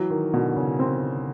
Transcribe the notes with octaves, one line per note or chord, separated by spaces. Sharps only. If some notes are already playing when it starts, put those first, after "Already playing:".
Already playing: E3 F#3
D#3
B2 D3
C#3
C4